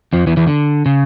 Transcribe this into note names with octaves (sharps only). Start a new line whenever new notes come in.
F2 F3
E2 E3
E2 E3
D3
C#3